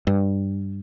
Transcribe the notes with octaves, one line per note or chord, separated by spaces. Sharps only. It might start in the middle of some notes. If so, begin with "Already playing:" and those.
G2